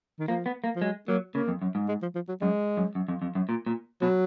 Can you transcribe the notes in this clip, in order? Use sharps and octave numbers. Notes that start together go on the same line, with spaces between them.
D#3
F3 A#3
B3
A#3
F3
F#3 G#3
F#3 A#3
C#3 A#3
F2
F#2
G#2
G#3
F3
F3
F#3
F#2 G#3
F#2
F#2
F2
F2
F#2
A#2
A#2
B2 F#3